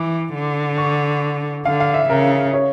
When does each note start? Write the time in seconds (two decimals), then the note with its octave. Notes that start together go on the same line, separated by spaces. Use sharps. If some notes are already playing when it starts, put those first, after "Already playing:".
Already playing: E3 D6
0.34 D3
0.78 C#6
1.65 D3 F5
1.80 F5
1.94 E5
2.09 C#3 A#4
2.53 C#5